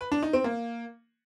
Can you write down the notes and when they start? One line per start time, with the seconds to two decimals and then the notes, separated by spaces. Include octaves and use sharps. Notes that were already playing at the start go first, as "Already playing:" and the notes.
0.01 B4
0.12 D4
0.22 D#4
0.33 C4
0.44 A#3